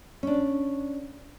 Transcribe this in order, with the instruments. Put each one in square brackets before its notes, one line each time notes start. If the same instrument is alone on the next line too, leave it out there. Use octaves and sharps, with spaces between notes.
[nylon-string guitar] C#4 D4